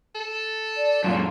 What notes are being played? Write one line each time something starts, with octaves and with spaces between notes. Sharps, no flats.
A4
D5
F#2 A#2 F4